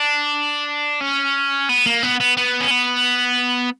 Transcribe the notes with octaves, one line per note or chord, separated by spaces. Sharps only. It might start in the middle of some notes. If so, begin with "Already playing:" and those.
Already playing: D4
C#4
B3
A#3
B3
B3
B3
C#4
B3